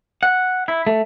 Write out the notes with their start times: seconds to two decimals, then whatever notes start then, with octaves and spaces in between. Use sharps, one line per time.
0.23 F#5
0.68 E4
0.87 A3